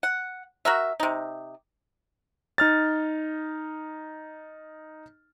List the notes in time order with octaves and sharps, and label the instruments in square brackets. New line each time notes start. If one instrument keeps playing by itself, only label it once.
[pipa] F#5
F#4 A#4 E5
C3 D#4
[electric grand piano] D#4 F6 A6